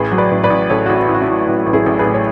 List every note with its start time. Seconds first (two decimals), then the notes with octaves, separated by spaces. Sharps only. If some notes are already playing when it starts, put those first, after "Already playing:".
Already playing: A1 G#4 B4
0.12 F#3
0.18 B4 D5
0.31 A1
0.44 B4 D5
0.50 A1
0.70 A1 A4 C#5
0.86 A1 F#4
0.96 E4
1.08 A1
1.15 F#4
1.22 E4
1.28 A2
1.47 A1 F#4
1.66 A1
1.73 E4 G#4
1.86 A1
1.99 G#4 B4
2.06 A2
2.14 C#5